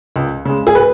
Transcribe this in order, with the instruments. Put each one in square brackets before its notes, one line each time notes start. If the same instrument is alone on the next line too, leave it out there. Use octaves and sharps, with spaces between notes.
[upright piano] C#2
C#3 G#3
G#4
B4